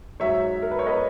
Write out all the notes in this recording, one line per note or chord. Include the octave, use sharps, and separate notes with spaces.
G#2 F#3 C#5 E5
A#4
B4
C#5
B4 D#5